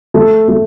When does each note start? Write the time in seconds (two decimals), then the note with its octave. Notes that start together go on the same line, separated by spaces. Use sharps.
0.14 A3
0.48 A3